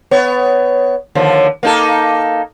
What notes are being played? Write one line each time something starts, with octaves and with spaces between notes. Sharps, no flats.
B3 C#5
D#2 D3 F3
A#3 D#4 A4